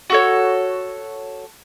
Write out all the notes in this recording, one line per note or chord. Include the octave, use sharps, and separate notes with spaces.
F#4 A4 C#5